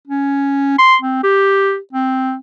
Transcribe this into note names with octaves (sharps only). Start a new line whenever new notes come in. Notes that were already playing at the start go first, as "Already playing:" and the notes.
C#4
C6
C4
G4
C4